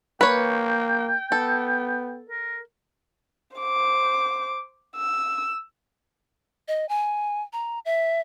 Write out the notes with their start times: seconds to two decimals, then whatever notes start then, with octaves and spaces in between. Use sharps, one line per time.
0.21 A#3 B4 C#5 G5
1.32 B3 A4
2.29 A#4
3.57 C5 D6
4.96 E6
6.68 D#5
6.89 G#5
7.53 A#5
7.85 E5